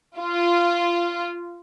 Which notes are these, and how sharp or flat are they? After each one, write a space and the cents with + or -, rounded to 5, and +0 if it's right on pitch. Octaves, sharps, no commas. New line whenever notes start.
F4 -15